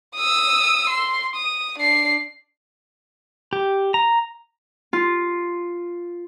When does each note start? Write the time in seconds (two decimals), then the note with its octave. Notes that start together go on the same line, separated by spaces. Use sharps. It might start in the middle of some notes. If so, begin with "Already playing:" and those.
0.16 D#6 E6
0.90 C6
1.36 D#6
1.79 D4 C7
3.53 G4
3.94 A#5
4.93 F4